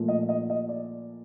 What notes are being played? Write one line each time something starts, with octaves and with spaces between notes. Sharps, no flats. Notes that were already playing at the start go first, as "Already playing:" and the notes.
Already playing: A#2 F3 A3
D#5
D#5
D#5
D5